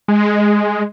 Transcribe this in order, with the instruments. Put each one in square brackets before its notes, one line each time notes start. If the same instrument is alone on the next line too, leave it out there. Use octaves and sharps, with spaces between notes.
[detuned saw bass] G#3